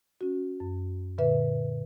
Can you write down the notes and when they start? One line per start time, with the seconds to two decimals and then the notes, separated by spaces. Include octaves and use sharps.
0.21 C#4 F#4
0.60 F#2
1.18 A#2 D3 B4 E5